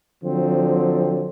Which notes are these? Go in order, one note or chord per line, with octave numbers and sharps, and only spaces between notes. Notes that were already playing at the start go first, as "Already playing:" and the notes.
D3 F3 F#3 C4